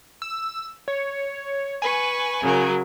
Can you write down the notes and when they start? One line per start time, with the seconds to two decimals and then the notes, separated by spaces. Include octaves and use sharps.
0.22 E6
0.88 C#5
1.82 B4 G#5 C#6
2.43 C#3 F#3 A#4